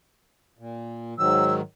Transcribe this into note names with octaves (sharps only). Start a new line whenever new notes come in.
A#2
G#2 D#3 F#3 E6